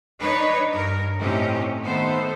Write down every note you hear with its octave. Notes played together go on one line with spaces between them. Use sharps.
D4 D#4 B4 C#5
G2 A#4
A2 C3 C#4 D#4 G4
D#3 A3 B3 A4 C5